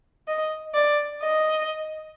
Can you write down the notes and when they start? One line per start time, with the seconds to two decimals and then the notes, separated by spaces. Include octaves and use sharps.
0.28 D#5
0.74 D5
1.22 D#5